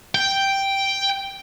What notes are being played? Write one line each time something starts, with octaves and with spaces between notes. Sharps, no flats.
G5